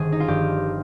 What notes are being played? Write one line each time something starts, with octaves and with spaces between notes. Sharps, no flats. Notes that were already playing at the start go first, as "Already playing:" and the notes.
Already playing: G1 D#3 G#4 C5
D#4
F4
G2 F3 G4